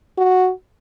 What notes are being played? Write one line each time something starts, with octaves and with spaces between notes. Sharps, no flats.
F#4